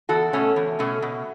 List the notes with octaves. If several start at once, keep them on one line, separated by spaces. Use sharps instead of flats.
E2 F#4 A4
B2 A3 C#4
E2
B2 A3 C#4
B2